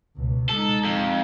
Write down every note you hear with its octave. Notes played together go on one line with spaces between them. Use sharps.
C#2 B2
G#3 D#4 A4
F2